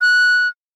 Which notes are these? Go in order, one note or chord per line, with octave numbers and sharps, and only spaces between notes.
F#6